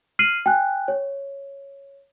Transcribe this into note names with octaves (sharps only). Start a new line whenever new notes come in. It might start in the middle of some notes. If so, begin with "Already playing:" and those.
F6 C7 D#7 F#7
G5 G#5 F#6
C#5